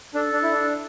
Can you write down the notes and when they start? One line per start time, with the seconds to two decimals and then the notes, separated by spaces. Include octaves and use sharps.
0.15 D4 A4
0.33 D4
0.43 E4
0.51 D4